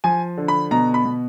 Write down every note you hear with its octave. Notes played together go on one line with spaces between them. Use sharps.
F3 G#5
D3
B5
B2 A#5
B5
B2